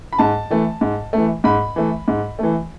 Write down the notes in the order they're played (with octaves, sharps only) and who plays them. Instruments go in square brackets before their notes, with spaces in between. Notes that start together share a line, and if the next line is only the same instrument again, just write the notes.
[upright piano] B5
G#2 A5
E3 A3
G#2
E3 A3
G#2 B5
E3 A3
G#2
E3 A3